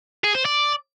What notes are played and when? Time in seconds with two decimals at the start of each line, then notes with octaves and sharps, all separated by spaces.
0.24 G#4
0.35 C5
0.45 D5